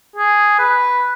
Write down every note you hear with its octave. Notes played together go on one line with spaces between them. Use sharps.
G#4
B4